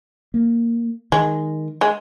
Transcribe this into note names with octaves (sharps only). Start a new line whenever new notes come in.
A#3
D#3 G#3
G#3